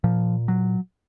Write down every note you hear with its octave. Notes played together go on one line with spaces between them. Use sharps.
A#2 F3
F#3